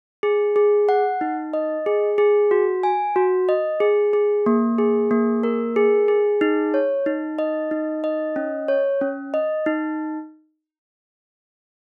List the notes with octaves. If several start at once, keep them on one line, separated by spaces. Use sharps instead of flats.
G#4
G#4
F#5
D#4
D#5
G#4
G#4
F#4
G#5
F#4
D#5
G#4
G#4
A#3
G#4
A#3
A#4
G#4
G#4
D#4
C#5
D#4
D#5
D#4
D#5
C#4
C#5
C#4
D#5
D#4